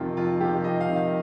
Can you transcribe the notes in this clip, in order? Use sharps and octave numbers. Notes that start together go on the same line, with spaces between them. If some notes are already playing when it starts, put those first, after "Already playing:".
Already playing: F2 C3 D#3 F4
F2 F4
C3 D#3 G4
F2 D#5
F5
C3 D#3
F5